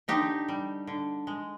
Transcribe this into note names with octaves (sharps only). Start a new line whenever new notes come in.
D3 D#4 G4
G3
D3
G#3